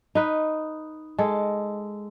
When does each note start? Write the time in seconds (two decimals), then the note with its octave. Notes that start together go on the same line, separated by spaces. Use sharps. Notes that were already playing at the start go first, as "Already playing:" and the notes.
0.15 D#4 B4
1.19 G#3 A4